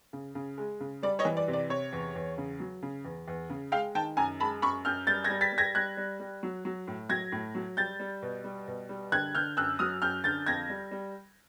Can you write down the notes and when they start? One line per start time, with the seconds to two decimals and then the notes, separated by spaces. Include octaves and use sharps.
0.13 C#3
0.35 C#3
0.58 G#3
0.80 C#3
1.03 G3 D5
1.19 C#5 D#5
1.25 E3
1.37 D5
1.48 C3
1.53 D5
1.70 C3 C#5
1.93 E2
2.16 E2
2.38 C#3
2.60 F#3
2.83 C#3
3.05 E2
3.28 E2
3.50 C#3
3.72 G#3 F5 G5
3.95 D#3 G5 A5
4.17 F#2 G#5 A#5
4.40 G#3 A5 B5
4.62 F#2 B5 C#6
4.85 F#2 F6 G6
5.07 G3 G6 A6
5.24 G#6 A#6
5.30 G3
5.41 A6 B6
5.52 G3
5.58 G#6 A#6
5.75 G3 F#6 G#6
5.97 G3
6.20 G3
6.43 F#3
6.65 F#3
6.88 A2
7.09 F#3 G#6 A#6
7.32 A2
7.55 F#3
7.77 G3 G6 A6
8.00 G3
8.22 B2
8.44 G3
8.68 B2
8.89 G3
9.12 D3 F#6 G#6
9.35 D3 F6 G6
9.57 F#2 E6 F#6
9.79 F#3 D#6 F6
10.02 F#2 F6 G6
10.24 D3 G6 A6
10.46 F2 G#6 A#6
10.69 G3
10.91 G3